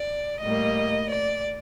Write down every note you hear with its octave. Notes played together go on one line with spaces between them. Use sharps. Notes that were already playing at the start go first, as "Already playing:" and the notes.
Already playing: D5
A2 G3 A#3 D#5
D5